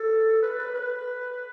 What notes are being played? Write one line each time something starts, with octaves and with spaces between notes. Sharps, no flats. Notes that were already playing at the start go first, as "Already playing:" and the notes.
Already playing: A4
B4
B4
B4